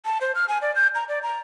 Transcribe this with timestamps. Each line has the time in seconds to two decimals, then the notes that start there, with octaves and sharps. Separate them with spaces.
0.05 A5
0.21 C5
0.35 F6
0.48 G#5
0.62 D5
0.76 G6
0.95 A#5
1.09 D5
1.23 A#5